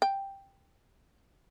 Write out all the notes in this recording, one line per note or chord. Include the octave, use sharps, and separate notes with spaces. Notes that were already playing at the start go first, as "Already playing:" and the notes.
G5